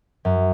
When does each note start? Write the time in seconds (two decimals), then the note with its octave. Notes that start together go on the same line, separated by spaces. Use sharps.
0.25 F#2